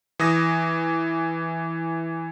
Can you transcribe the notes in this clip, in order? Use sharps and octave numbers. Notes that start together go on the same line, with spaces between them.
E3 D#6 A#6